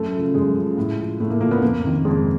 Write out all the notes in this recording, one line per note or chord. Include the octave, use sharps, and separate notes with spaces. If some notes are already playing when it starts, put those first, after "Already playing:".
Already playing: F#2 A3
C#3 F3
F#2 G#3
C#3 F3
A2
F3
A2 A3
A#3
F3 A#3
B3
F2 A#3
C3 D#3
F2 G#3